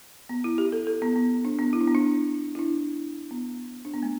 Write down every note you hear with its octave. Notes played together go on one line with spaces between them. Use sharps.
B3
E4
G4
A4
A4
B3
B3
D4
B3
E4
D4
B3
D4
E4
D4
B3
D4
B3
A3